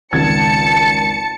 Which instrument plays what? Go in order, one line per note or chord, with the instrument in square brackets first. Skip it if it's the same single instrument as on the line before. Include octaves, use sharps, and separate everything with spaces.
[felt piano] G#1 C#2 G#6 [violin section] A5 C#7